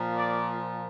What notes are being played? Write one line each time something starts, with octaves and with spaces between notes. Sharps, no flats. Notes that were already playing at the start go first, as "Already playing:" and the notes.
Already playing: A#2 F3
D5